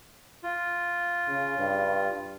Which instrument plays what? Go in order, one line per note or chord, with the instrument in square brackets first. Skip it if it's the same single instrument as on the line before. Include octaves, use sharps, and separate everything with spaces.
[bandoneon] F4
[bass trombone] C#3
G2